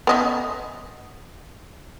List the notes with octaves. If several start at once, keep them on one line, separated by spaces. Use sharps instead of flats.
B3 D#5 E5